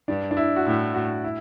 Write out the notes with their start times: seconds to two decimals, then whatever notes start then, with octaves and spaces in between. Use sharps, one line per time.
0.08 G2 D4
0.31 D4
0.37 E4
0.56 F#4
0.66 A2 E4
0.94 F#4
1.24 E4